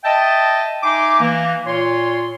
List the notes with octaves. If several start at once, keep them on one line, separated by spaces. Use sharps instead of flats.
D#5 E5 G5 A5
D#4 E5 G#5 C6 D6
E3 A#3
A#2 F4 C#5 C6